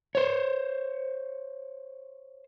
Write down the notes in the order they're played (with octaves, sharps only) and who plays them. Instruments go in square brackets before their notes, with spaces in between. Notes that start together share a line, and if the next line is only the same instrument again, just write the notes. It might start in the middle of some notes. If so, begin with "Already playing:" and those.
[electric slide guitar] C5 C#5